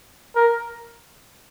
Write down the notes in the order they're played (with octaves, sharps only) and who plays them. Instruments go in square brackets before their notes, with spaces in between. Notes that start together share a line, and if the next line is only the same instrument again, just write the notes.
[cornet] A#4